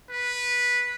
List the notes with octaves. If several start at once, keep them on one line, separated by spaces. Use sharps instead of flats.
B4